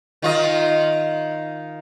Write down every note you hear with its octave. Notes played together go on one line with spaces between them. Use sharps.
D#3 F4 D#5